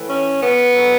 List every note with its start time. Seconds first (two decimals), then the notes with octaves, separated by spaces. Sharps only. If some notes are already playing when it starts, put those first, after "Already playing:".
Already playing: A2 E3
0.08 C#4
0.41 B3
0.74 D3 F#3